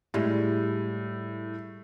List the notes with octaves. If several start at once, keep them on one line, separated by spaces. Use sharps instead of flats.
A2 G3 G#3 F4